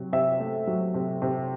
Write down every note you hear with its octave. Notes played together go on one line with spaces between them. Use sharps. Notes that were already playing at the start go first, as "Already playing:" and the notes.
Already playing: C3 F#3
C3 E5
A3
F#3
C3
C3